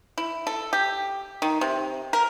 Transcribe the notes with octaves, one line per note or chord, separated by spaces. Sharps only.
E4
A4
G4
D#3
C3
A#4